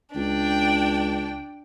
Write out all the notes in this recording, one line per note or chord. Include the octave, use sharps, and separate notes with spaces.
C#2 D4 G5